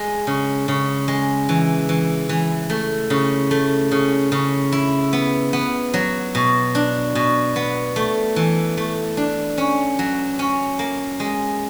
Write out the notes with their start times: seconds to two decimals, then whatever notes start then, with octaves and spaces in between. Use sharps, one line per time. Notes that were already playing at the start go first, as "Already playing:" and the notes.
Already playing: G#3
0.27 C#3
0.68 C#3
1.08 G#3
1.49 E3
1.89 E3
2.29 E3
2.70 A3
3.10 C#3
3.51 A3
3.91 C#3
4.32 C#3
4.72 E4
5.13 B3
5.53 B3
5.94 F#3
6.35 B2
6.75 D4
7.15 B2
7.56 B3
7.96 A3
8.36 E3
8.77 A3
9.17 D4
9.58 C#4
9.99 F#3
10.39 C#4
10.79 A#3
11.20 G#3